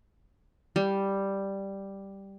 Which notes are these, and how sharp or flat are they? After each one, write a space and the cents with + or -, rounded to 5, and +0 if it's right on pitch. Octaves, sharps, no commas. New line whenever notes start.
G3 +0